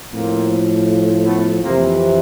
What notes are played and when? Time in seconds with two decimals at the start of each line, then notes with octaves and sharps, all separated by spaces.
0.12 A2 F3 A#3 C4
1.26 A3 B3
1.63 F2 C3 E3 A#3 C4